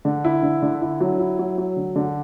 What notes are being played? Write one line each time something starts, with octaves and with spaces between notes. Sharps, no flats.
D3
E4
D3
D3
E4
F#3
E4
F#3
F#3
D3
D3